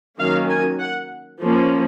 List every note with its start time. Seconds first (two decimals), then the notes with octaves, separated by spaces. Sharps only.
0.19 D#3 F#3 A#3 C#4 F5
0.49 G#5
0.79 F#5
1.40 F3 A#3 C#4